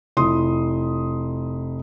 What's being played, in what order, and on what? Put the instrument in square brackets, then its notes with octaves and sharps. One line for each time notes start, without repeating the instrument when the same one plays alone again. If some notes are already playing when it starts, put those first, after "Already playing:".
[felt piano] F1 E4 C6 D#6